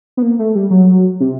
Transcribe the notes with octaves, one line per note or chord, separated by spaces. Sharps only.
B3
A#3
A3
G3
F#3
C3